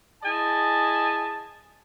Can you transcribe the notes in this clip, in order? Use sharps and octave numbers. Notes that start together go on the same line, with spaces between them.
E4 G#4 D#5 G#5 A5